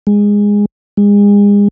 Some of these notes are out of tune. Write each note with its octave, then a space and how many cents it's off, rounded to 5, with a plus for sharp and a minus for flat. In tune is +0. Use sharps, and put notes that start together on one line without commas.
G#3 -15
G#3 -35